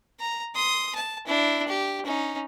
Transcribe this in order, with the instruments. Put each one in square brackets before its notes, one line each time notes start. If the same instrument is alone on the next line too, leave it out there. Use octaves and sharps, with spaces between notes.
[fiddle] A#5
C6 D#6
A5
D4 E4
G4
C#4 D#4